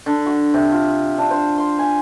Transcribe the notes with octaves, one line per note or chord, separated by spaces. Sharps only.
D3
F#4
C3
F4
D4
C5
C6
G#5